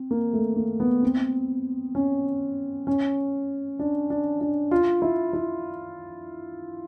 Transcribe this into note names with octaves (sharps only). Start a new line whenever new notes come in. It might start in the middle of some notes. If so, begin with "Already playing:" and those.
Already playing: C4
A#3
A3
A#3
B3
C4
C#4
C#4
D4
D4
D4
F4
E4
E4